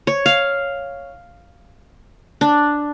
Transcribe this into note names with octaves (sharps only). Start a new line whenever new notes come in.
C#5
F5
D4